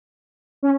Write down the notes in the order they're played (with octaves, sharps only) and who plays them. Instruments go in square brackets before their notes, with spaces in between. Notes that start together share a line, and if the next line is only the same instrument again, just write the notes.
[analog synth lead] C#4